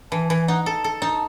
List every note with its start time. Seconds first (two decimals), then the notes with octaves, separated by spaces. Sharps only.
0.11 E3 A5
0.30 E3 G#5
0.48 D#4 F#5
0.66 A4 A5
0.84 A4
1.02 D#4